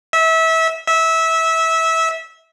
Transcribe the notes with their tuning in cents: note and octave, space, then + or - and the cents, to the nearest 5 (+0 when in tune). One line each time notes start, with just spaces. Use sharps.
E5 -25
E5 -20